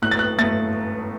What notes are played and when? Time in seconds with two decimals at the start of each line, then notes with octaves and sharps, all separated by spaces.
0.02 A2 F#6
0.11 A6
0.19 F#6
0.38 A3 A6